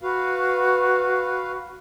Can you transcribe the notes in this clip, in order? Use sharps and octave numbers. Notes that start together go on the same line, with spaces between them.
F#4 B4 F5